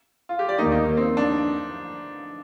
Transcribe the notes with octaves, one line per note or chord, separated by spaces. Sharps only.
F4
G4
D5
D#2 D#3 A#3 D#4
D#4
C4
D4